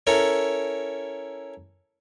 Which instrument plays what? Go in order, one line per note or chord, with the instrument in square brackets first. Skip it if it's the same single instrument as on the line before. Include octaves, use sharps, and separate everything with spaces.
[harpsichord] C#4 E4 A4 A#4 C#5